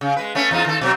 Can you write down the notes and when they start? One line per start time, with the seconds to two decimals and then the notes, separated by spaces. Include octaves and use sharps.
0.01 C#3
0.16 G#3 B4
0.35 A3 B3 C#4
0.51 E2 D#4 F4
0.66 D#3 A4
0.81 B2 F#3 C4